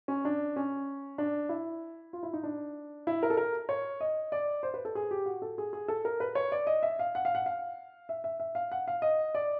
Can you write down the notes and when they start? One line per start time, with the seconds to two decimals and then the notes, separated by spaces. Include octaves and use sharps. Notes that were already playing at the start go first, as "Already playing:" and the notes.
0.08 C#4
0.25 D4
0.56 C#4
1.18 D4
1.49 E4
2.13 F4
2.23 E4
2.33 D#4
2.43 D4
3.07 E4
3.23 A#4
3.30 A4
3.37 A#4
3.69 C#5
4.01 D#5
4.32 D5
4.63 C5
4.74 B4
4.85 A4
4.95 G#4
5.11 G4
5.26 F#4
5.42 A4
5.58 G#4
5.73 G#4
5.88 A4
6.05 A#4
6.20 B4
6.35 C#5
6.52 D5
6.67 D#5
6.83 E5
6.99 F5
7.15 F#5
7.25 F5
7.35 F#5
7.46 F5
8.09 E5
8.24 E5
8.40 E5
8.55 F5
8.72 F#5
8.88 F5
9.02 D#5
9.35 D5